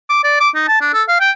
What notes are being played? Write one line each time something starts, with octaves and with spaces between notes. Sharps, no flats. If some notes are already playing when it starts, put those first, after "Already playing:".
D6
D5
D6
D#4
A5
D4
A4
F5
G5